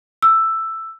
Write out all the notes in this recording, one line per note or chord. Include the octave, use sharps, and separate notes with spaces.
E6